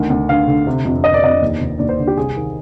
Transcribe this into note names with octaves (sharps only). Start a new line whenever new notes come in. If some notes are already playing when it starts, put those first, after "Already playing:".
Already playing: D2 D#3
D2
D3 F5
D3
C3
F2
C3 D#5
D5
F2 D#5
D#2
D#2
D#2 D5
C5
D3
G4
C2 G#4
D#3